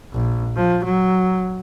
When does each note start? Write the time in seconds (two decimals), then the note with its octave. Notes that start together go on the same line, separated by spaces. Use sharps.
0.13 A#1
0.56 F3
0.84 F#3